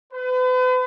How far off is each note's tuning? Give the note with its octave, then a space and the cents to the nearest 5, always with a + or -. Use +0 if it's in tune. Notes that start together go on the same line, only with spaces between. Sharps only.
B4 +40